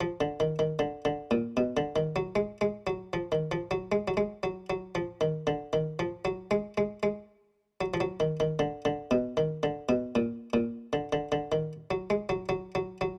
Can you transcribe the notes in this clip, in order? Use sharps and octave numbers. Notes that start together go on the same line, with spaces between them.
F3
D3
D#3
D#3
D3
D3
A#2
B2
D3
D#3
F#3
G#3
G#3
F#3
F3
D#3
F3
F#3
G#3
F#3
G#3
F#3
F#3
F3
D#3
D3
D#3
F3
F#3
G#3
G#3
G#3
F#3
F3
F#3
D#3
D#3
D3
D3
B2
D#3
D3
B2
A#2
A#2
D3
D3
D3
D#3
F#3
G#3
F#3
F#3
F#3
F#3